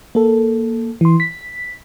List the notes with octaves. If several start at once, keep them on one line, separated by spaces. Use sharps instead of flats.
A#3 A4
E3 C6
B6